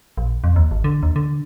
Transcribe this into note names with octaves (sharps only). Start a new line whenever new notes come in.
A#1
F2
D#2
G#1
D3
D#2
D3